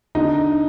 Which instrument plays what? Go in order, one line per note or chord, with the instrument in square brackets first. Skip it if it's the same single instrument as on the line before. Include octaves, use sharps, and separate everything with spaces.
[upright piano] D3 D#4